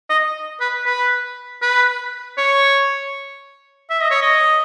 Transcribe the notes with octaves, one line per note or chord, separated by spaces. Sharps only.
D#5
B4
B4
B4
C#5
E5
D#5
C#5
D#5